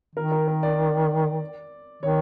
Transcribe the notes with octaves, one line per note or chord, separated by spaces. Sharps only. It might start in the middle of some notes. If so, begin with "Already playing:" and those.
D#3 A#4
A#4
A#4
D5
D#3 C#5